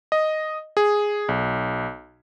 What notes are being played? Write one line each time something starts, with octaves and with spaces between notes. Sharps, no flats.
D#5
G#4
B1